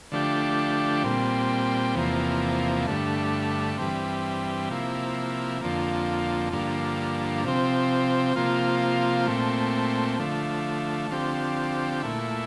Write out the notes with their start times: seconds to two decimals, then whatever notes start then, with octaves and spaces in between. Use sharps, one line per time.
0.12 D3 F3 A3 D4 G4
1.04 A#2 G3 C4
1.95 E2 C3 F3 A#3
2.87 G2 D3 A3
3.78 G2 E3 G3 C4
4.70 C3 F3 A#3 E4
5.61 F2 D3 F3 A#3
6.52 G2 D3 F3 A#3
7.44 C3 F3 C4
8.36 C3 F3 A#3 F4
9.27 A#2 A3 C4
10.19 D3 F3 A3
11.11 D3 F3 C4 G4
12.02 A#2 A3 E4